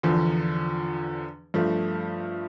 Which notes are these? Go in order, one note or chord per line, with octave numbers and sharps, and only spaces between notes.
E2 D3 F3
G2 F3 A3